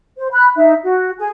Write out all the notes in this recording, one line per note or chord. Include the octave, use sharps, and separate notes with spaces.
C5
B5 F#6
D#4 E5
F#4
G#4 G#5